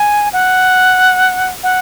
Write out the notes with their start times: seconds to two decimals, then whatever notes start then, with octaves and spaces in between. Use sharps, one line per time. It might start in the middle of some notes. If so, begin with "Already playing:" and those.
Already playing: G#5
0.33 F#5
1.63 F#5